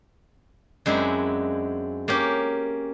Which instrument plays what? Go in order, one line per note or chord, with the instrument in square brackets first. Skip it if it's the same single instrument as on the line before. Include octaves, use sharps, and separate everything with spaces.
[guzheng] F#2 G#3 C4 D4 E4
A#3 C#4 G4